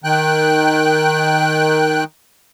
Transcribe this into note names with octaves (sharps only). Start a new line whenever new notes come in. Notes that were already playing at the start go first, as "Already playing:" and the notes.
D#3 G5 F#6